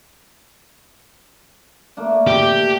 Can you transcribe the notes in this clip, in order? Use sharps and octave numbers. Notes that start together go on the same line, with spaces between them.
A3 A#3 D4
G4